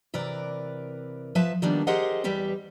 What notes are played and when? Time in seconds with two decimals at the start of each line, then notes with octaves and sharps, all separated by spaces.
0.14 C3 E3 A#4 B4 D5
1.35 F3 B4 E5 A5
1.62 D#3 F3 G3 A#3 B3 D4
1.87 G4 G#4 A#4 C5 D#5 F#5
2.24 E2 G3 G4 B4